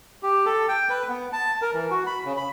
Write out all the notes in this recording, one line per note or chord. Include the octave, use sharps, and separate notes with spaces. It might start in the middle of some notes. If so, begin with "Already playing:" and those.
G4
A4
G5
B4
B3
A5
A#4
E3
F#4
B5
C#3
B5